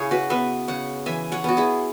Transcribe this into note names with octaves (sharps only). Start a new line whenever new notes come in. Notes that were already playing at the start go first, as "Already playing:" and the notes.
Already playing: C#3 C#4 E4 G#4 C#5
F#4 B4
B3 B4 E5
C#3 C#5 F#5
E3 E5 G#5
C#5 F#5
B3 F#4
E4 G#4